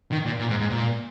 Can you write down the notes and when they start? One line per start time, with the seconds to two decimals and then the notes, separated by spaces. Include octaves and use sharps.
0.12 D#3
0.25 A#2
0.40 A#2
0.50 G#2
0.60 G#2
0.70 A#2